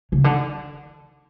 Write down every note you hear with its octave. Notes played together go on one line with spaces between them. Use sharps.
C#3
D3